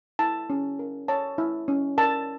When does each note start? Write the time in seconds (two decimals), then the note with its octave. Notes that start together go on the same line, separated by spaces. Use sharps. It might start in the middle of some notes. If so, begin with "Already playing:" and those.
0.19 E4 A5
0.50 C#4
0.79 A#4
1.08 C#5 A5
1.38 E4
1.68 C#4
1.98 A#4 A5